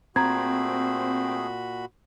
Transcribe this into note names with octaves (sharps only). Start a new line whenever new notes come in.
A#2 A3 C4 F#4 G#4 A#5 B5 G#6